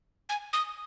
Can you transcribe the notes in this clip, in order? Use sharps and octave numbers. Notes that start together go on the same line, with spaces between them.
G#5
D#6